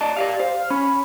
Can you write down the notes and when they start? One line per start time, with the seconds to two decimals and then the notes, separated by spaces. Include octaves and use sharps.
0.01 D5 D#5 A5
0.16 G4 D5 E5 F5
0.40 C5 F5
0.55 F6
0.70 C#4 B5